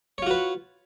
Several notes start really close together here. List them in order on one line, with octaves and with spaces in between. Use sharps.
C#5 F4 F#4 B4